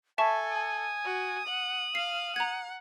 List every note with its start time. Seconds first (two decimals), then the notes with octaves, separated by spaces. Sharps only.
0.18 A4 E5 G#5 A5 C#6
0.51 D#6
1.04 F#4
1.47 F#5 F#7
1.95 F5 C7
2.36 F#5 A#5 G#6